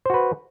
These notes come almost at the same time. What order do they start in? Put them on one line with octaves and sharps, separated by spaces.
C5 F#4 B4